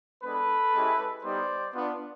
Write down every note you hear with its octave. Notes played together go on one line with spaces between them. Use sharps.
G#3 B3 D4 A4 B4
G#3 C#4 E4 G4
G3 B3 D#4 G4 C5 D5
B3 D4 F4